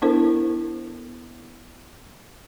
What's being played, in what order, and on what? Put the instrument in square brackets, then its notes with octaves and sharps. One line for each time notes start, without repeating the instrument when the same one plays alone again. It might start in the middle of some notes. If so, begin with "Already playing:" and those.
[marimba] B3 D4 E4 A4 A#4 C5